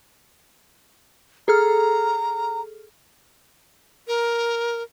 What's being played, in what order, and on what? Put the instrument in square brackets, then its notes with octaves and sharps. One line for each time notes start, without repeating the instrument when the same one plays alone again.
[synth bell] G#4 A4 F6 [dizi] A#5
[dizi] A#4